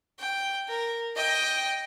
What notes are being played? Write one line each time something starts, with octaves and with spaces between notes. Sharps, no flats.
G5
A#4
D#5 G5